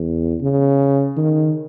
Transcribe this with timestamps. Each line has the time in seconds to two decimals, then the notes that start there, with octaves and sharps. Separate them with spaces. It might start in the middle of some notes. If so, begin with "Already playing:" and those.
Already playing: E2
0.42 C#3
1.17 D#3